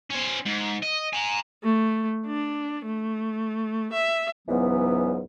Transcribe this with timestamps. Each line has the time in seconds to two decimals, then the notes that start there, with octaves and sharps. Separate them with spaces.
0.10 C#4 C5
0.46 G#2
0.82 D#5
1.13 G#5 A#5
1.64 A3
2.27 D4
2.86 A3
3.93 E5
4.48 C#2 G#2 E3 F#3 B3